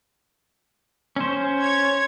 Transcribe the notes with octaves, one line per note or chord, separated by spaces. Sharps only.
C#4 C5
C#5 G#6